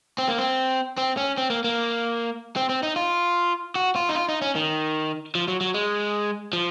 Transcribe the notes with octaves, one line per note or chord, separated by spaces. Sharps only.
C4
A#3
C4
C4
C#4
C4
A#3
A#3
C4
C4
D#4
F4
F#4
F4
D#4
F4
D#4
C#4
D#3
F3
F#3
F#3
G#3
F3